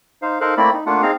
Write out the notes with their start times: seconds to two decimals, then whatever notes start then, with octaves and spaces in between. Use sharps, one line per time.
0.22 D#4 C5 F5
0.41 D#4 A4 A#4 C5 F5 F#6
0.57 A3 A#3 C4 E4 D5 B5
0.73 D#4
0.86 A3 A#3 D4 F4 F#5
1.02 C4 D#4 G#4 F5 A#5